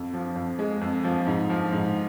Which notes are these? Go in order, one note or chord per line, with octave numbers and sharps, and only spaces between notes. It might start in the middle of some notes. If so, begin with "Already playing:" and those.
Already playing: F2
F3
F2
G#3
F2
F3
G#2
F3
G#2